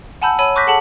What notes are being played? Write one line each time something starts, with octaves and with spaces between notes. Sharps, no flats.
F#5 G#5 A5 B5 E6 G6
C#5 B5 E6 D#7
C#6 D6 F#6 G6 A#6 B6
G#4 A4 F#5 A5 F#7